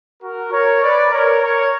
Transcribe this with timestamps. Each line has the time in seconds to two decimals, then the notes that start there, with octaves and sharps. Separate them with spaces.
0.22 F#4 A#4
0.52 A#4 C#5
0.82 B4 D5
1.12 A#4 C#5
1.42 A#4 C#5